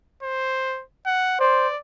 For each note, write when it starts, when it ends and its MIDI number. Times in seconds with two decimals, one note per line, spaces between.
0.23 0.83 72
1.06 1.36 78
1.40 1.68 72
1.40 1.78 74